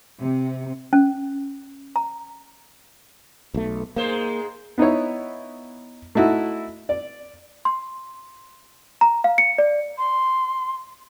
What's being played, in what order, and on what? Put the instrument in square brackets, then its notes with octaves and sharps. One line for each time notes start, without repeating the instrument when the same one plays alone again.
[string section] C3
[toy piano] C#4
A#5
[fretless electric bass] B1 A3
[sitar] G#2 G#3 C5 [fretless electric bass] A#3
[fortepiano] B3 D#4 E4 C#5
A3 D#4 E4 F#4
D5
[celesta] C6
A#5
F5
C#7
D5
[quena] C6